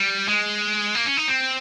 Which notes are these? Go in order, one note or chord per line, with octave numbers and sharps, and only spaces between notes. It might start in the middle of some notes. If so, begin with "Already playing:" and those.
Already playing: G3
G#3
A#3
C#4
D#4
C4